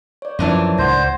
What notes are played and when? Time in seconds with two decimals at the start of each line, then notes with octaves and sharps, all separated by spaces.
0.22 C#5 D5
0.39 F#2 A#2 E3 F3 D4
0.78 C#2 A2 C5 F#5 G#6 A#6